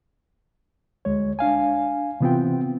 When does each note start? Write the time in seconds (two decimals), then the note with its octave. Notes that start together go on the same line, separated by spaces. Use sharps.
1.05 D2 G#3 C#5
1.39 D4 F5 G#5
2.21 C3 E3 B3 C4 F4 G5